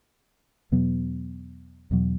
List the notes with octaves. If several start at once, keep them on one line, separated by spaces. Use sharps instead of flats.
E2 B2 F#3 B3
E2 B2 F#3